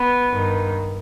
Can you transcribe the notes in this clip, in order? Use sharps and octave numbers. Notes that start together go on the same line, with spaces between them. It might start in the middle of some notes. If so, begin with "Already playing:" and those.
Already playing: B3
G2 D#3